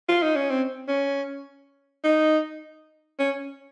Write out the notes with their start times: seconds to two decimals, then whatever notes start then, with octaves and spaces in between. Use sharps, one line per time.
0.09 F4
0.23 D#4
0.36 C#4
0.50 C4
0.88 C#4
2.04 D#4
3.19 C#4